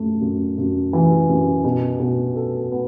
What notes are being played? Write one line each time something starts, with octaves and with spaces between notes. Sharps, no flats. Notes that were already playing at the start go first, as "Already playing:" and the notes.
Already playing: F#2 A3
F#2
F#2
E3
F#2
B2
B2
A4
B3